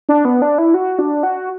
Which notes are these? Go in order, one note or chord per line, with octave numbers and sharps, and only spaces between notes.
D4
B3
D4
E4
F#4
D4
F#4